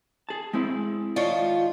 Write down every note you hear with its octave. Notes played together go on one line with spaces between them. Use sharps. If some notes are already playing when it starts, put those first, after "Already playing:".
G#4 A5
G#3 C4 E4
D#3 F3 F4 C#5 D5